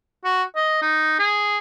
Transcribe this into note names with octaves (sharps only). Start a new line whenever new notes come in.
F#4
D#5
D#4
G#4